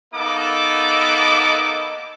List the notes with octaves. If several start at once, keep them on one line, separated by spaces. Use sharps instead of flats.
A#3 B3 D#4 A4 D6